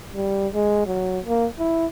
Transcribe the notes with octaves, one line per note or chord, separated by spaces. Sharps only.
G3
G#3
F#3
A#3
E4